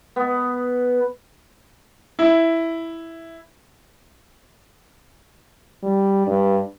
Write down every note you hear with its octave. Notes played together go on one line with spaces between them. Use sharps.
B3
E4
G3
G2